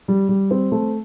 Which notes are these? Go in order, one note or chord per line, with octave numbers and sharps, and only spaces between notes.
G3
G3
C4
A3